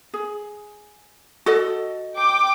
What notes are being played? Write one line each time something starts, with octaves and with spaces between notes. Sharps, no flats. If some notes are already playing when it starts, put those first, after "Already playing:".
G#4
F#4 A4 D#5
G5 D6